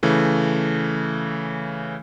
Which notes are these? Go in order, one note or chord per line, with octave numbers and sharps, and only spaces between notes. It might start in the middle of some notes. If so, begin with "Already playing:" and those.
C#3 E3 A3